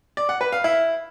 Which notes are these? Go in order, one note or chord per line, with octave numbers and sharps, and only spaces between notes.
D5
F#5
B4
F5
E4